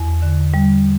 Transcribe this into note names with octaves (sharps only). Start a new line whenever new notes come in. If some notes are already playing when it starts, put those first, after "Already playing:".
Already playing: E2
D3
G3